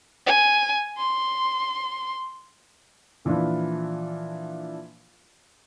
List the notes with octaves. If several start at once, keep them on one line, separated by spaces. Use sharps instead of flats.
G#5
C6
A#2 E3 F3 D4 E4 F4